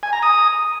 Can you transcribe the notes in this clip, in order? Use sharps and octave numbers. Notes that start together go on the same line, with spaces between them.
G#5
A#5
D#6